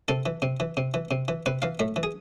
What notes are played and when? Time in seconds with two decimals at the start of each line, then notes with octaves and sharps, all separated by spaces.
0.08 C3 A4
0.26 E3
0.42 C3
0.60 E3
0.77 C3
0.94 E3
1.11 C3
1.28 E3
1.46 C3 B4
1.62 E3 F5
1.79 A2 E5
1.96 E3
2.03 G#4